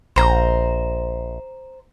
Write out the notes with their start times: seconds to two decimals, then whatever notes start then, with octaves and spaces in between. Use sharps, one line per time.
0.16 A#1 C5 A#5